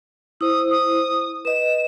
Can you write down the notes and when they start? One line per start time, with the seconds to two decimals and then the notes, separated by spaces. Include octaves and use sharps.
0.41 E4 C5 D#6
0.71 D#6
1.45 B4 D#5 E7